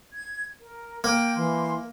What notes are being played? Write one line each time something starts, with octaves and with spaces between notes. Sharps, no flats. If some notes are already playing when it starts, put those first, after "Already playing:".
G#6
A#4
A#3 G5
E3 C6